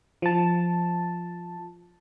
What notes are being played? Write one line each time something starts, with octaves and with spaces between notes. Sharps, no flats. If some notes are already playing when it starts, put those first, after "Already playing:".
F3 A5